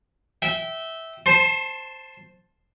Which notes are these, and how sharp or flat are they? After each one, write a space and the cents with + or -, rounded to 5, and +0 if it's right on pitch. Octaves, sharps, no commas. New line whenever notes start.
E5 -15 G5 -25
C5 +0 A5 +0 C6 +35